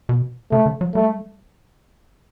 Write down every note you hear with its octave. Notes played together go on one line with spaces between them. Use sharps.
B2
C#3 A3
D3
F#3
G3 A3